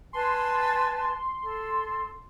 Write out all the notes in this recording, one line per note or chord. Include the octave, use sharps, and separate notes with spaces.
B4 G#5 A5 C6
A4